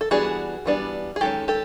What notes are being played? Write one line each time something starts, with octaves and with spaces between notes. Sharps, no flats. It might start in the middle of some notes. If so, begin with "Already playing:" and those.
A4
E3 G3 B3 D4 F#4 G#4
E3 G3 B3 D4
G#4
D#3 G#3 C#4 G4 A4
G4 A4